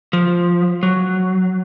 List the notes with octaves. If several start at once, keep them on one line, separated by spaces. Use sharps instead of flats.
F3
F#3